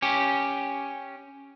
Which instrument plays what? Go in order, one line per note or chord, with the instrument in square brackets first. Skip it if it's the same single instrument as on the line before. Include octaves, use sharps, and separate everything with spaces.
[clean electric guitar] C#4 G4